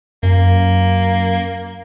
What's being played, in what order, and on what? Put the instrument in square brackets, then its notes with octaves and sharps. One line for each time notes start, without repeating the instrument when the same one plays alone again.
[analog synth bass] F#2 [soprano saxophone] A#3